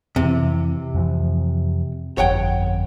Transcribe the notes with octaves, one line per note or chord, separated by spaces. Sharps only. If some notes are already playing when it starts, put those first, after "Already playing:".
F2 C3 E3
F2 E3 F3
G1 F2 C#5 F#5 G5